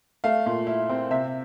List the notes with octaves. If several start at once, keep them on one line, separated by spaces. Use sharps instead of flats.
A3 F5
A#2
E4
C4
C3 E5